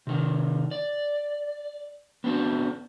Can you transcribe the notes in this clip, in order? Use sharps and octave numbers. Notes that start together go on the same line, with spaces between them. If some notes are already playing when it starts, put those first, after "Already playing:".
C3 D#3
D5
B3 C4 D4 F#4